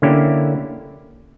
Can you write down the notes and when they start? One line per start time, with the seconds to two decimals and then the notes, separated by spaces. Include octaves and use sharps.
0.02 D3 A#3 C#4 E4 G4